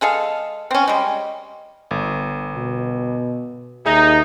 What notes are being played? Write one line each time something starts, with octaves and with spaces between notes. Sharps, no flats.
G#3 G#4 A4 F5
C4 C#4
G3 G#3
G1
B2
D#2 D#4 G#4 E5